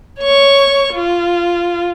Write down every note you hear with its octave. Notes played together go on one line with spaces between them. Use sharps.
C#5 C#6
F4